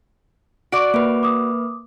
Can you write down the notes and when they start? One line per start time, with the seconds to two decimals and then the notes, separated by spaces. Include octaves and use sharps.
0.72 F#4 D5 C#6 D6 D7
0.94 A#3 B4
1.23 D6 D#6